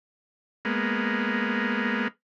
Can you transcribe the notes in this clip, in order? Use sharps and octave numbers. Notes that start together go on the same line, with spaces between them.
G#3 A#3 B3